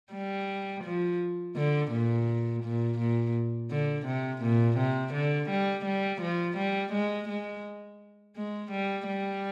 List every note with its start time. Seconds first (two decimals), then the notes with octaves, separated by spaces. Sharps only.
0.13 G3
0.84 F3
1.56 D3
1.92 A#2
2.64 A#2
2.99 A#2
3.71 D3
4.07 C3
4.43 A#2
4.78 C3
5.14 D3
5.50 G3
5.86 G3
6.22 F3
6.57 G3
6.93 G#3
7.29 G#3
8.36 G#3
8.72 G3
9.08 G3